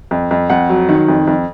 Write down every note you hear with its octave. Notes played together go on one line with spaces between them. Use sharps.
F2
F2
F2 F#5
F#3
D#3
F2
F2